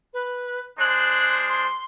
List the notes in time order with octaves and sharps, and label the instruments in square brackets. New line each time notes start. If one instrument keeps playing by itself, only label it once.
[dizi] B4
[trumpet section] G#3 D4 C5 [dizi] F#6
[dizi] C6